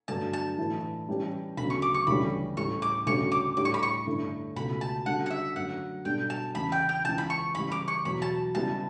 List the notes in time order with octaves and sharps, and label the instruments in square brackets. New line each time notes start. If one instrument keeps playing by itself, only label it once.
[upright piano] G2 D3 F#3 A3 [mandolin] A5
[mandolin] A5
[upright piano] A2 E3 A3 E4 B4
E3 G3 C#4 G4
[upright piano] D2 C#3 F#3 B3 [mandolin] B5
[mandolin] C#6
D6
C#6
[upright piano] D2 C#3 E3 G3 C#4 [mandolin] B5
[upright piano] A2 G3 C#4 [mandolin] C#6
[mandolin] D6
[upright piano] D2 C#3 G3 C#4 F#4 [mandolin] C#6
[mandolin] D6
[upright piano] A2 G3 D4 G4 C#5 [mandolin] D6
[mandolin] C#6
B5
C#6
[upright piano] G2 D3 A3 E4
[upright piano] C#2 B2 A3 [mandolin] B5
[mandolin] A5
[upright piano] D3 G3 C#4 F#4 [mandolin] F#5
[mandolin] F#5
E5
[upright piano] F#2 D3 F#3 A3 [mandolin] F#5
[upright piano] B2 G3 D4 A4 [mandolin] G5
[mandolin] A5
[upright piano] E2 C#3 E3 [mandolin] B5
[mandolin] G5
G5
[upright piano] C#2 C#3 E3 [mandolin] A5
[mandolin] B5
C#6
[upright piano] C#3 E3 G3 [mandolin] B5
[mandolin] D6
C#6
[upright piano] E2 B2 F#3 B3 F#4 [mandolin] B5
[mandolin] A5
[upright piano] C#3 G3 B3 E4 [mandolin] A5